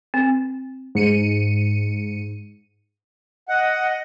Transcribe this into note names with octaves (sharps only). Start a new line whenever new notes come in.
C4
G#2 C#7 D#7
D#5 F#5